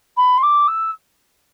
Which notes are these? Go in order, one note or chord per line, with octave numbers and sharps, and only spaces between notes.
B5
C6
D6
E6